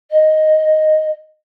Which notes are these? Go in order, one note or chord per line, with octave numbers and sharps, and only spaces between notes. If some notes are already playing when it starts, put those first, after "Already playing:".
D#5